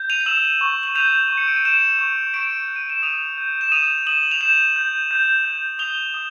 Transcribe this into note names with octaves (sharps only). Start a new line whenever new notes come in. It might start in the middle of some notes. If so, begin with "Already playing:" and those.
Already playing: G6
D#7 F7
F7
E6 E7 F#7
C#6
F#7
G6 D#7 F7
C#6
C#7
D7
D#7
F#6 D7 E7
C#6
C#6 D7 E7
F#6
D#7
E7
D#6 D#7 F7
G6
E7
D#6 D#7 F7
D#6 E7 F#7
F7
G6 E7 F#7
G6
G6
G6
D#6 F7 G7
D#6